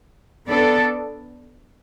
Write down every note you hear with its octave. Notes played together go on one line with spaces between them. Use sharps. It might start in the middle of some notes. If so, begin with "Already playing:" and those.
B3 D4 A4 D5